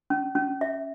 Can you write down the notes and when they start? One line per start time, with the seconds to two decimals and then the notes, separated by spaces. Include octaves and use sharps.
0.10 C#4
0.35 C#4
0.61 E5